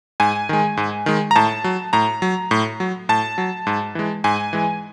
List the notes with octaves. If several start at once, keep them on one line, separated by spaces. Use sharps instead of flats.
G#2 G#5
D#3 G#3
G#2
D#3 G#3
A#5
A2 A5
F#3
A2 A#5
F#3
A2
F#3
A2 A5
F#3
G#2
E3 G#3
G#2 G#5
E3 G#3